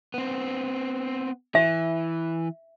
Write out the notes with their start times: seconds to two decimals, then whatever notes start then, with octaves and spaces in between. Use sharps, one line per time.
0.14 B3 C4
1.55 E3 E5